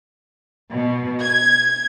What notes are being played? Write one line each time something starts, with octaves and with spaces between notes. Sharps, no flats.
B2
G#6